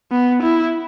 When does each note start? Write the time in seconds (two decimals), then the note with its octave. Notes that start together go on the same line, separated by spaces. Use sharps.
0.12 B3
0.42 E4